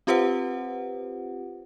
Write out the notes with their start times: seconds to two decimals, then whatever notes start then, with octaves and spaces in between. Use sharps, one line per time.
0.07 C4 F4 G4 B4 C5 F#5